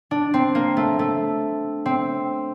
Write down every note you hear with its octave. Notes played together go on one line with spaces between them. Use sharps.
D4
C4
A#3
A3
A3
C4